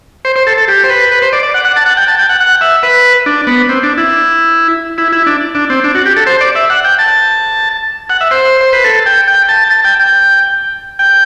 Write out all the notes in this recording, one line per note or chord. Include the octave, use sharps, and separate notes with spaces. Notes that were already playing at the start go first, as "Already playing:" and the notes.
C5
C5
A4
A4
G4
C5
B4
B4
C5
D5
D5
F#5
F#5
A5
F#5
G5
A5
G5
F#5
F#5
E5
B4
D4
B3
C4
D4
E4
E4
E4
D4
D4
C4
D4
F#4
G4
A4
C5
D5
E5
F#5
G5
A5
F#5
E5
C5
C5
B4
A4
G5
G5
A5
A5
G5
G5
G5